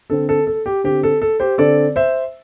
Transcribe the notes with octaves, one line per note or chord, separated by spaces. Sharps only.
D3 C4 A4
A4
A4
G4
D3 C4 G4
A4
A4
G4 C5
D3 C4 A4 D5
C5 E5